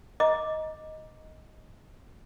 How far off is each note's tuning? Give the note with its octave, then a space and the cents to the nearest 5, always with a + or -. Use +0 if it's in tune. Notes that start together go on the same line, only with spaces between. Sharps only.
D#5 +5 A#5 +10 D6 +0